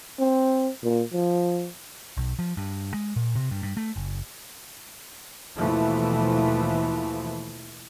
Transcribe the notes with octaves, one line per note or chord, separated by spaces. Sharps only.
C4
A#2
F3
B1
F3
G2
G#3
A#2
C3
G2
G2
A3
F#1
D#2 B2 E3 F3 A3